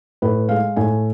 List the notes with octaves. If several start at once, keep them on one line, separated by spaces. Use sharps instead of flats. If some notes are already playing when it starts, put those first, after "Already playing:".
A2 B4
G#3 F5
A2 G#5